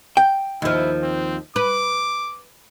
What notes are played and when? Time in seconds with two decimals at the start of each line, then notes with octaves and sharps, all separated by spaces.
0.17 G5
0.62 D#2 F3 E4
1.02 C4
1.56 B4 D6